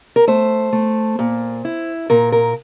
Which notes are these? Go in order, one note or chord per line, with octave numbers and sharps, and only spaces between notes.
A#4
A3 C5
A3
A#2
E4
A#2 A#4
A#4